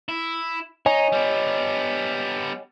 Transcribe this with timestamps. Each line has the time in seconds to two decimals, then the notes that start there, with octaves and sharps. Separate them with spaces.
0.09 E4
0.86 D#4 C#5 D#5 G#5
1.12 G3 B3